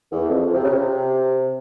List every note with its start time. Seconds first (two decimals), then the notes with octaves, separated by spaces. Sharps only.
0.12 E2
0.29 F2
0.46 F2
0.54 C3
0.63 C#3
0.72 C3